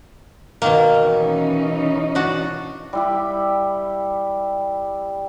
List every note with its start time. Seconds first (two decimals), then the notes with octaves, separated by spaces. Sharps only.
0.62 B2 D#3 A#3
0.98 E3 C#4 D#4
2.15 D4 F#4
2.93 G3 E4 G4